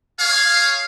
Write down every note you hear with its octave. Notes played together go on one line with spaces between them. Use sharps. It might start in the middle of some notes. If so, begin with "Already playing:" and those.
G#4 C#5 F5